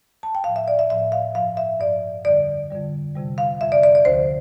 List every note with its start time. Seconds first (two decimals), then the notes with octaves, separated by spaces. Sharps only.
0.23 A5
0.35 G5
0.44 A2 F3 F5
0.56 E5
0.68 D5
0.79 E5
0.90 A2 F3 E5
1.12 F5
1.35 G2 F3 F5
1.57 E5
1.80 G2 F3 D5
2.25 F2 D3 G3 D5
2.70 F2 D3 G3
3.15 F2 C3 G3
3.38 F5
3.61 F2 C3 G3 E5
3.72 D5
3.83 D5
3.95 D5
4.05 D2 D3 F3 C5